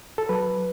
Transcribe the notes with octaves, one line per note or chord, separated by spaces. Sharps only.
A4
F#3 B4